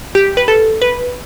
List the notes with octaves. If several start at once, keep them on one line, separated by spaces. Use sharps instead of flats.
G4
B4
A4
B4